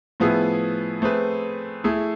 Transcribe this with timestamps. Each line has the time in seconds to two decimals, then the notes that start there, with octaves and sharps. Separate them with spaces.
0.20 A2 F3 B3 E4 G#4
1.02 A3 C4 G#4 B4
1.84 A3 E4 G#4